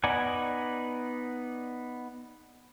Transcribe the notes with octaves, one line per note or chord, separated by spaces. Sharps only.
B3 D#4 D5 F#5 G#5